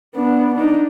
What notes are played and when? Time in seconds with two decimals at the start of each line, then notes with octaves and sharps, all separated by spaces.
0.15 B3 D4
0.55 D4 D#4